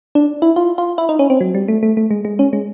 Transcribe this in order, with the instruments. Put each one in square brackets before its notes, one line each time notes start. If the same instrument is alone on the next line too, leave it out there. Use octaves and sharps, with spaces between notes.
[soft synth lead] D4
E4
F4
F4
E4
D#4
C#4
C4
F#3
G3
A3
A3
A3
G#3
G#3
C#4
G#3